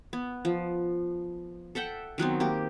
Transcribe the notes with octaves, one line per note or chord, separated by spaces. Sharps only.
B3
F3
A4 E5 F#5 G5
D#3 F#3 B3 C4
A#3 G4